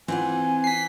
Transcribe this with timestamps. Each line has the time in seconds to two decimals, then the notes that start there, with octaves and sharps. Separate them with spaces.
0.08 E3 C4 F4 F#5 G#5
0.64 B6 C7